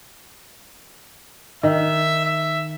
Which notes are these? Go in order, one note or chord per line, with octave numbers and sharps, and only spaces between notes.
D#3 E5
E5